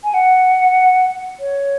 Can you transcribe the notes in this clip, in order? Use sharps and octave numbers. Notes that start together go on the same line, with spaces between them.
G#5
F#5
C#5